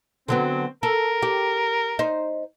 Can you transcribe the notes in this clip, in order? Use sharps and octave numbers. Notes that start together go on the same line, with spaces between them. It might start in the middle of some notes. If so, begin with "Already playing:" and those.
D3 F#3 B3 C4
A4 A#4
G4
D#4 C5